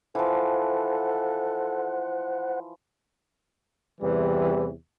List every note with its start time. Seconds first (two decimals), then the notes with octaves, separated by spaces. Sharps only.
0.15 E3 F3 A4 C5 F#5
4.01 E2 C3 E3 G3